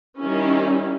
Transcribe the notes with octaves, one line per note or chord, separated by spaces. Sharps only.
D#3 G3 C#4 E4